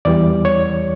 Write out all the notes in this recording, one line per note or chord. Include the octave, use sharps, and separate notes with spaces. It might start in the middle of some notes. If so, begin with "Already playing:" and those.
E2 E3 G3 D5
C#5